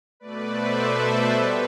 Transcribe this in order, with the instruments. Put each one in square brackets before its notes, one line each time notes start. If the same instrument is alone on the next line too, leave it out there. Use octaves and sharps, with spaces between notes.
[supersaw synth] B2 A3 B4 D5
C5 E5
A4 C5
B2 G3 G4 B4